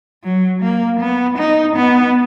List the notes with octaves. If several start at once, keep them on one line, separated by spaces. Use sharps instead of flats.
F#3
A#3
B3
D#4
B3